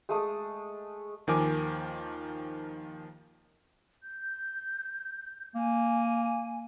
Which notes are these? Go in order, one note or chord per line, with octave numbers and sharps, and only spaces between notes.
G#3 A3 D#6
D#2 D#3 F3 A#4 G#5 D6
G6
A#3 G#5